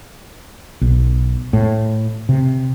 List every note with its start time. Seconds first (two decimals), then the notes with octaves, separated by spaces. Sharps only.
0.81 B1
1.53 A2
2.29 C3